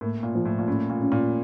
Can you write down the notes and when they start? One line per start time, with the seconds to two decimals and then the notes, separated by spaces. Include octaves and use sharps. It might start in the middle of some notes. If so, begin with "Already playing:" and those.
0.01 A2 A#3
0.23 A#2
0.35 F3
0.45 A2
0.59 A#2
0.68 A2 C#4
0.90 A#2
1.01 C#4
1.12 A#2